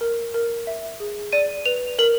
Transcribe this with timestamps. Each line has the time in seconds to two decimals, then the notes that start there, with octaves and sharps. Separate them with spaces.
0.01 A#4
0.34 A#4
0.67 E5
1.00 G#4
1.32 D5 D#7
1.66 B4 F7
1.99 A#4 F#7